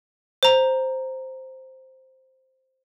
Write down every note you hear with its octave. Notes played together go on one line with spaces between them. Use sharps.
C5 A#5